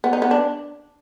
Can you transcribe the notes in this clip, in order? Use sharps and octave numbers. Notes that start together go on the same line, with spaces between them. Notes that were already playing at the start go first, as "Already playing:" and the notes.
B3
D#4
B3
D4